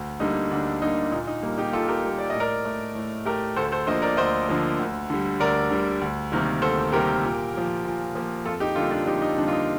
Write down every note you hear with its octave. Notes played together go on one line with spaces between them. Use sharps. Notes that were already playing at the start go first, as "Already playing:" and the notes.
Already playing: D2
D3 G3 A#3 D#4
D2 D4
D3 G3 A#3 D#4
A#2 D#4
D#4
G3 A#3
D#4 G4
A#2 F4 A4
G4 A#4
G3 A#3
D5
A2 D#5
A#4 D5
A3
A2
A3 G4 A#4
D2 A4 C5
A4 C5
D3 F3 A#3 C5 D#5
A#4 D5
D2 C5 D#5
D3 F3 A#3
D2
D3 G3
D2 A#4 D5
D3 G3
D2
C3 D#3 G3 A#3
D2 A4 C5
C3 D#3 G3 A#3 G4 A#4
A#2
F3 A#3
A#2
F3 A#3
F2 F4 A4
D#4 G4
D3 G3 A#3 F4 A4
D4 F4
F2 D#4 G4
D#4
D3 G3 A#3 D4
F4
D#4